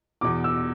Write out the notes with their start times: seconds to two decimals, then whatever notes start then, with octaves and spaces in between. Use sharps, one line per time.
0.21 E2 B2 D6
0.44 E6